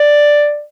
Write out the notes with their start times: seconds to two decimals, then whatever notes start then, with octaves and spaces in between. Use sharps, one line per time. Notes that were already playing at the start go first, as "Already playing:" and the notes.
Already playing: D5